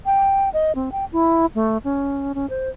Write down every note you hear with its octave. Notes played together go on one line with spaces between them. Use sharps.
G5
D#5
C4
G5
E4
A3
C#4
C#4
C5